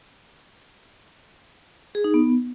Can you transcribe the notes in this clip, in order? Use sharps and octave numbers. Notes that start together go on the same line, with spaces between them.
G#4
D#4
B3